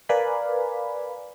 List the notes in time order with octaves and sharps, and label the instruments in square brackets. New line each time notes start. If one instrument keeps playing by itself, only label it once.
[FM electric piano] A#4 B4 D5 F5 G#5 B5